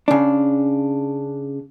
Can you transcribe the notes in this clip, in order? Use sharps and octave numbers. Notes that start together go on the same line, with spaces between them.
C#3 D4